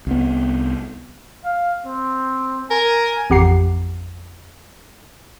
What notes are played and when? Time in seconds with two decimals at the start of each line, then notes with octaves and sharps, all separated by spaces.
0.07 C2 B3
1.45 F5
1.86 C4
2.71 A#4 G#5
3.30 A1 F2 G4 F#5 A#5 C7